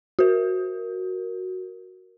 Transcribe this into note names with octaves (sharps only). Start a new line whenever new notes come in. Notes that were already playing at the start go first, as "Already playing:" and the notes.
F#4 A#4